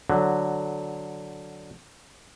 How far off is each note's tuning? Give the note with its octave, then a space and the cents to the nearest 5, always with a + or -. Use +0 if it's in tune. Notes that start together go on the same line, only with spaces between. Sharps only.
D3 +0 F#3 +0